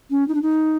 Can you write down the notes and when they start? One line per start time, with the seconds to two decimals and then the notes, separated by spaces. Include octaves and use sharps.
0.10 C#4
0.28 D#4
0.35 D4
0.42 D#4